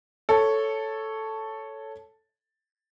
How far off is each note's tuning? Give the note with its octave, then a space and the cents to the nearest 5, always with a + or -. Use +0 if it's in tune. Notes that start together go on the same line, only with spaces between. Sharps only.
A4 +0 C#5 +0